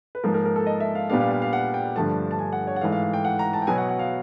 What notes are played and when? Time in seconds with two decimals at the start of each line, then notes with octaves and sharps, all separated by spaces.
0.15 B4
0.24 G#2 F3 A#3 A#4
0.34 A#4
0.45 A#4
0.56 A4
0.66 D#5
0.80 E5
0.95 F5
1.10 A#2 G3 B3 D4 F5
1.20 F5
1.31 F5
1.42 F5
1.53 F#5
1.74 G5
1.96 G2 D3 F3 A3 A5
2.31 A5
2.39 G#5
2.53 F#5
2.67 C#5
2.76 F#5
2.81 G#2 E3 A3 F5
2.92 F5
3.03 F5
3.13 G5
3.25 F#5
3.39 A#5
3.53 A5
3.62 G5
3.67 B2 F#3 B3 G#5
3.78 F#5
3.89 F#5
3.99 F5